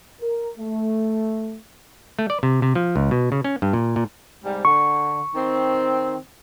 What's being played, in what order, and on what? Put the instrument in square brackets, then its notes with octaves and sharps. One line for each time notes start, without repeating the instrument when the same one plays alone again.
[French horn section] A#4
A3
[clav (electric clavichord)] A3
D5
C3
C3
F3
C#2
B2
C#3
C#4
G2
A#2
A#2
[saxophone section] G#2 C3 G3
[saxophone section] D3 [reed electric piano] C#6
[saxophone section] D#3 C4